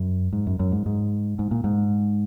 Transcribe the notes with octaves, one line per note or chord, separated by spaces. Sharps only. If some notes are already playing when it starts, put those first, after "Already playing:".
Already playing: F#2
G#2
F#2
F#2
G#2
G#2
G#2
A#2
G#2